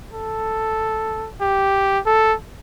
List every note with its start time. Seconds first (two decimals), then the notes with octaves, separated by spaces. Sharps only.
0.12 A4
1.41 G4
2.06 A4